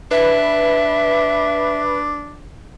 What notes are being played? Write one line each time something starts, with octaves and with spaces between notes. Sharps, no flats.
D4 B4 E5